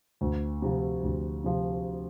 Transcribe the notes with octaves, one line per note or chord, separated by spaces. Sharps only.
D2
C3 F3
D2
C3 F3